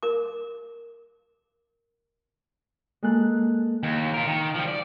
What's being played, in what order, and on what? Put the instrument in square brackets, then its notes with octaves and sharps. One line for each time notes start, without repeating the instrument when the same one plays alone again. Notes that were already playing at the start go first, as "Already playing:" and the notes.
[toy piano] A#4 D6
[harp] G#3 A#3 A4 F#6
[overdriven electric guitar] D#2
F4 A#4
D#3
F3 G3
D5